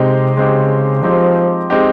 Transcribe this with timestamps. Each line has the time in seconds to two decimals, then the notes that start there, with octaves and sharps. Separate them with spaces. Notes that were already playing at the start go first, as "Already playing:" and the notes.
Already playing: C3 G#3 C4 D#4 G4
0.37 C#3 G#3 C4 D#4 G4
1.03 F3 G#3 C4 D#4 G4
1.70 G#3 C4 D#4 G4